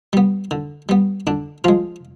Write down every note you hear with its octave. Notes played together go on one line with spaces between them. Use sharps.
G3 B3
D3
G3 B3
D3 D4
F3 G#3 F4